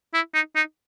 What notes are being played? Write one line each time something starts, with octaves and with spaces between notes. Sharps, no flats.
E4
D#4
D#4